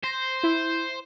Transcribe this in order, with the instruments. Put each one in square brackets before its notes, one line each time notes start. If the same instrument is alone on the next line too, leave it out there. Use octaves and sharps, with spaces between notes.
[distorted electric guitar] C5 [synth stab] C6 A#6
[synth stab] E4